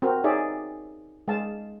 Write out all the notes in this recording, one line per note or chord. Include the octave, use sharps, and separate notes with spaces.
C4 F#4 A#4
D#4 G#4 C#5 D5 E5
G#3 F5 A5